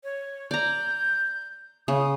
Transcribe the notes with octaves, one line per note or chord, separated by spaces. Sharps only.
C#5
D5 A#5 G6
C#3 D#6